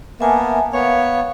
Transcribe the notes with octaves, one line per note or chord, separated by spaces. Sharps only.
A#3 B3 E5 G#5 A5
B3 C#5 F5